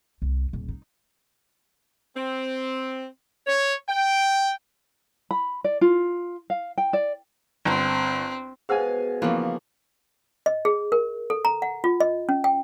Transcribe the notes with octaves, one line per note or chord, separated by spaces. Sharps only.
C2
D#1
D#4
C4
C#5
G5
B5
D5
F4
F5
G5
D5
G1 C4
B2 G#3 G#4 C5 F5 F#5 G#5
C#3 E3 F3 A#3 B3
D#5
G#4
A#4
A4
A#5
F#5
F4
D#5
C#4
G5